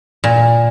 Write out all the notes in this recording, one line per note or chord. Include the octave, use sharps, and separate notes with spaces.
A#2